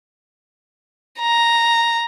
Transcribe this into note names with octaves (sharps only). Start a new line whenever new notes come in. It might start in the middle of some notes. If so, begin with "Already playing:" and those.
A#5